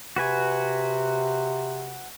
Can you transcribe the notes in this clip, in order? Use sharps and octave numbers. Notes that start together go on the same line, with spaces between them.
C3 F#4 B4 G#5